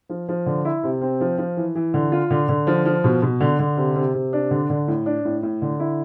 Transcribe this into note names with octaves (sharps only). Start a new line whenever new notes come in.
F3
F3
D3
E4
C3
C4
F3
F3
E3
E3
D3
F4
D3
D3
F3
F3
B2
B2
D3
D3
C3
C3
C3
D4
D3
D3
A2
D4
A2
A2
D3
E4